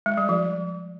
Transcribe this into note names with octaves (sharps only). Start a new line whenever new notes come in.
G#3
G3
F3